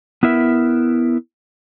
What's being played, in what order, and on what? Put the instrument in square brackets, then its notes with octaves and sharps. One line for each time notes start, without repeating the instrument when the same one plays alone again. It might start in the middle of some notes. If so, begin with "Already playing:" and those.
[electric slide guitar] B3 E4 A#4 E5